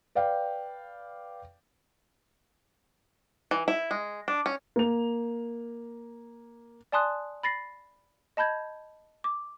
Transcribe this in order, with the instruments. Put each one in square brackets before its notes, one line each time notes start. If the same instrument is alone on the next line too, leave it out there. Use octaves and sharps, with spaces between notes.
[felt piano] B4 D5 F5 G5
[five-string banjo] E3
E4
G#3
D4
C#4
[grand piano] A#3 F7
[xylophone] D5 G#5 A5 C6 D#6 F#6
B5 A6 A#6 C7
D#5 A5 B5 G6 G#6
D6